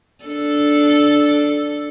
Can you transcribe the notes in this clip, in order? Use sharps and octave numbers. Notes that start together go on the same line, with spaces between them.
D4 A4